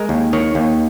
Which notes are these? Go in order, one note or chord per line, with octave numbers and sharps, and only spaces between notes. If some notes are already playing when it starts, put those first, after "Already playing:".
Already playing: G#3 A#4
D#2
D#3 C#5
D#2